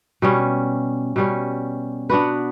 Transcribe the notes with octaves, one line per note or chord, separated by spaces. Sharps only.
B2 G3 C#4
B2 G3 C#4
B3 D4 F#4 B4